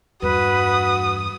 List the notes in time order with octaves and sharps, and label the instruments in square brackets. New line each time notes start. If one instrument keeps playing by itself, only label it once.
[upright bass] E2 G2 [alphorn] F#4 [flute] B4 [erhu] D#6